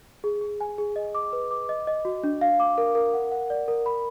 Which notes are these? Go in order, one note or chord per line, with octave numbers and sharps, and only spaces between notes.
G#4
G#4
G#5
G#4
D#5
D6
B4
D6
D#5
D#5
F#4
D4
F5
D6
A#4
A#4
F#5
F#5
D5
A#4
B5